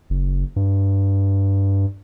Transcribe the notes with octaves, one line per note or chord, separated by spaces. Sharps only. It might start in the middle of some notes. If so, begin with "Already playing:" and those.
F#1
G2